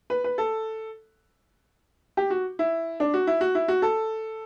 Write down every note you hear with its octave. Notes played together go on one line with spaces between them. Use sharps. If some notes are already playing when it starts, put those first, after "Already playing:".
B4
B4
A4
G4
F#4
E4
D4
F#4
E4
F#4
E4
F#4
A4